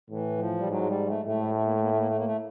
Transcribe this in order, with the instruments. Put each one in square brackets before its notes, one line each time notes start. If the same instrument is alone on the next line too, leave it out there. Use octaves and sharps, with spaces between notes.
[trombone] A2 [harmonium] E3
[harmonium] F3
G3
[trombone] G#2 [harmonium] F#3
[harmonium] G#3
G3
A3
[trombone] A2 [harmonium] A3
[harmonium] A3
A#3
A3
A#3
A3
A#3
A3
A#3
A3